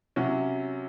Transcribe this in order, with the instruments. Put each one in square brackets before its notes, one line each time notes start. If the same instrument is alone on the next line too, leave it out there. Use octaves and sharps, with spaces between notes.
[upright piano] C3 F#3 C#4 F#4